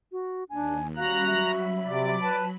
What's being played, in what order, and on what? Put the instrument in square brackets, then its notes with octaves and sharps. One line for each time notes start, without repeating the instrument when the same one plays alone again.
[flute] F#4
[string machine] D#2 [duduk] D4 [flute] G#5
[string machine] G3 C#4 B5 [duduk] F#4 [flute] F5 [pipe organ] A#5 F#6
[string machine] F#3 B5 [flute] E5
[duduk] C3 [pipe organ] D5
[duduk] B4 [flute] A5